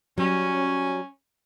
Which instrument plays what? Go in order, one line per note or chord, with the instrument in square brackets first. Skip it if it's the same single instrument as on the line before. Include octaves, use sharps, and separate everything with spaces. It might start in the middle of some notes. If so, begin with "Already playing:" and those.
[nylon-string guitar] F#3 G3 [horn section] C#4